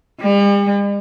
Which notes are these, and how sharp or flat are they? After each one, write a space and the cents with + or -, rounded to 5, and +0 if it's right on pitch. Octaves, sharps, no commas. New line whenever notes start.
G3 +45